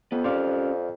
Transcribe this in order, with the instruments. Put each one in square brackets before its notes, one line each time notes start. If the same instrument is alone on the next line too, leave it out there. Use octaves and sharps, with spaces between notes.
[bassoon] F2 [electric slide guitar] B3
[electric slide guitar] C#4 G4 A#4 [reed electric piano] C5 D5 F5